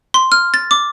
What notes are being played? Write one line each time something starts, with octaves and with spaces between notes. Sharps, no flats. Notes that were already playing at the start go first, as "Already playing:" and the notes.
C6
F6
A6
D6